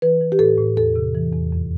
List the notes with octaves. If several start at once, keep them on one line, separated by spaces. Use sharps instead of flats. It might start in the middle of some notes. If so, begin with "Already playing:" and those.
E3 B4
E3
G4
A2 A4
A2
E2 A4
C3
E3
E2
F2